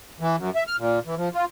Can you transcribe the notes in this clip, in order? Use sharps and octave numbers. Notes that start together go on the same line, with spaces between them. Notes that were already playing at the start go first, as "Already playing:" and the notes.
E3
F#2
E5
F6
A#2
E3
F3
F4